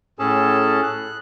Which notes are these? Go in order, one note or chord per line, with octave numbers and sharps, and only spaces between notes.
A2 C#4 G#4 A4 A5
F#6